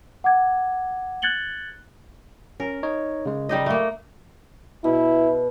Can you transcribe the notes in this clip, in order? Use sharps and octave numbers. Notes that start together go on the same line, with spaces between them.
F#5 D6 G#6
F#6 G#6 A6 C#7 F#7 G7
C#4 A#4
D#4 C#5 D#5
C#3 G#3
G3 D#4 D#5
A3 A#3
B2 E4